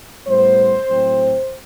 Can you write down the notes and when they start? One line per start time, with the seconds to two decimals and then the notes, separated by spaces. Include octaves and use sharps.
0.26 A2 G3 B3 C5
0.88 A2 F#3 C4